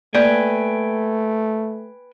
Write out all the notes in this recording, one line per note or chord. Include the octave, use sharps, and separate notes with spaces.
A3 A#3 B4 D5 G5 G#5